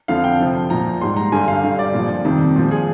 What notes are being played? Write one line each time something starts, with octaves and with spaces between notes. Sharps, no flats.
F2 D3 F3 F5
G5
F2 C3 F3
A#2 F3 A#5
G#2 G3 C6
A#5
G2 D3 G3 G#5
F5
G2 D3 G3
D5
A#2 F3
F2 C3 D#3 G3
A#2 F3
G#4